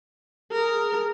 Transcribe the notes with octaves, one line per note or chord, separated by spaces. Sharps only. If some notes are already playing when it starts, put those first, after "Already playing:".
G#4 A#4